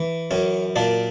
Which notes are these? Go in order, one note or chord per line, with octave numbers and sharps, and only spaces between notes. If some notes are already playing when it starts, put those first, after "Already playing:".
Already playing: E3
F#2 C#4
A#2 D4